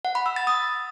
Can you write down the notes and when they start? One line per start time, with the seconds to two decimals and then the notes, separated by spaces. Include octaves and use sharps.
0.05 F#5
0.15 B5
0.26 E6
0.36 A6
0.47 D#6